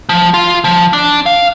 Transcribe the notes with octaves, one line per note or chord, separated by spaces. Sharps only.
F3
F4
F3
D4
F5